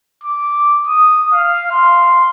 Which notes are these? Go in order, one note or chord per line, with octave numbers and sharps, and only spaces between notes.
D6
D#6
F5
C6